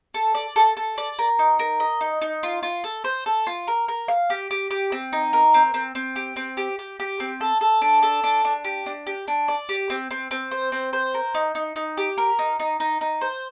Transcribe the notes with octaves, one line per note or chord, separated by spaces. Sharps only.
A4
D5
A4
A4
D5
A#4
D#4
A#4
D#5
D#4
D#4
F4
F4
A4
C5
A4
F4
A#4
A#4
F5
G4
G4
G4
C4
D#4
A#4
C4
C4
C4
G4
C4
G4
G4
G4
C4
A4
A4
D4
A4
D4
D4
G4
D4
G4
D4
D5
G4
C4
C4
C4
C5
C4
C5
A#4
D#4
D#4
D#4
G4
A#4
D#4
D#4
D#4
D#4
C5